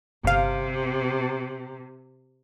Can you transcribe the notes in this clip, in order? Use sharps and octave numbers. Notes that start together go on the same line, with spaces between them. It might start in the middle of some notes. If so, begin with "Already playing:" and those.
G1 C3 F5